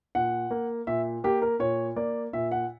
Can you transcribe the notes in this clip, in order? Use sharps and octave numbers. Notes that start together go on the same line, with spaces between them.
A#2 F#5
A#3
A#2 E5
A#3 G4
A#4
A#2 C#5
A#3 D5
A#2 E5
F#5